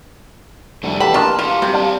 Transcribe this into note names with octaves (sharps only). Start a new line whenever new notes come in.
F1 C2 D3 A3 D4 F#4
E3 G4 A4 F#5 G5 A5 B5
B2 A#3 D4 F4 A#5
E4 F4 G4 A4
C3 G3
C4 D4 G4 D5 F5 A5